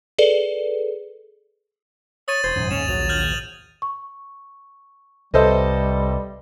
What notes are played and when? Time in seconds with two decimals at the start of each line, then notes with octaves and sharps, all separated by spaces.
0.18 G#4 A4 B4 D5
2.28 C#5 D#6 A6 D#7
2.44 E1 C5 G#6
2.56 E1 F#2 A2 D#3
2.71 G#1 D#2 G#2 C#4 E7 F7
2.88 A#1 F#3 F7
3.09 F6 G6 F#7
3.82 C#6
5.34 C2 G3 A4 B4 C5 D#5 E5 C6